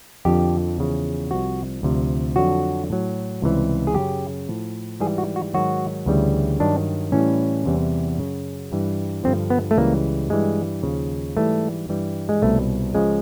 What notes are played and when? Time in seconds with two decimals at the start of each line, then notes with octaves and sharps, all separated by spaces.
0.25 F2 D3 F3 G4
0.78 E2 C#3 F3
1.31 C2 C3 F3 F#4
1.83 D2 C3 F3
2.36 F2 D3 F#3 F#4
2.90 A2 F#3
3.42 C#2 C3 E3 G3
3.87 G#4
3.95 F#2 C#3 F#3 G4
4.49 A2 F3
5.00 G#2 E3 G3 G#4
5.18 F#4
5.36 F#4
5.54 G#2 D#3 F#3 F#4
6.06 D2 C#3 E3 G3
6.60 G2 D#3 F#3 D4
7.12 A2 E3 G3 C#4
7.66 E2 C3 E3 G3
8.18 F#2 C#3 F#3
8.72 G2 E3 G3
9.24 G2 D3 F3 C4
9.50 B3
9.71 A3
9.77 C#2 C#3 E3 G3 A#3
10.30 G2 E3 G3 G#3
10.83 D#2 C#3 F3
11.37 G#2 E3 G3 A3
11.89 G2 E3 G3
12.29 G#3
12.42 C2 B2 G3 A3
12.95 C#2 C#3 F3 G#3